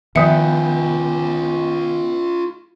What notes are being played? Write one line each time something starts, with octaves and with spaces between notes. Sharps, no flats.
D#3 F3 B3 F4 G#4 B4 E5 G5